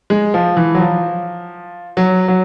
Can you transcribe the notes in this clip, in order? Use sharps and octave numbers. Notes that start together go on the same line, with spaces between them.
G#3
F3
E3
F#3
F3
F#3
F#3